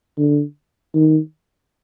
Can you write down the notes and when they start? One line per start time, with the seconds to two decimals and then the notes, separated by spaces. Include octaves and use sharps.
0.18 D3
0.95 D#3